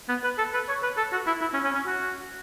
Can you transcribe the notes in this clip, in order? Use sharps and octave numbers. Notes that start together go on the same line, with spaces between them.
B3
B4
A4
B4
C#5
B4
A4
F#4
E4
E4
C#4
C#4
C#4
F#4